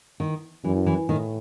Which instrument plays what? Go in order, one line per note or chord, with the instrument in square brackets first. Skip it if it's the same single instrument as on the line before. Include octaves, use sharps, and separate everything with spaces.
[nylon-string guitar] D#3
[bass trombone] F#2 [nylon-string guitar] E3
[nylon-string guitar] E3
[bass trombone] A2 [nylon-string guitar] D#3